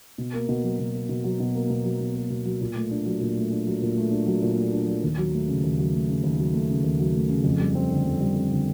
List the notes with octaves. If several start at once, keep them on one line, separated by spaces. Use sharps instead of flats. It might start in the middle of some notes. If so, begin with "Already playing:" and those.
B2
A#3
B2
F#3
B2
A#3
B2
F#3
B2
A#3
B2
F#3
B2
A#3
B2
F#3
A#2
A3
D4
F#3
A#2
A3
D4
F#3
A#2
A3
D4
F#3
A#2
A3
D4
F#3
D#2
F#3
A3
C#3
D#2
F#3
A3
C#3
D#2
F#3
A3
C#3
D#2
F#3
A3
C#3
F2
G3
C4
D3
F2
G3
C4
D3